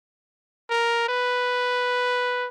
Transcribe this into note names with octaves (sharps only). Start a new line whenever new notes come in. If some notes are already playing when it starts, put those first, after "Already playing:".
A#4
B4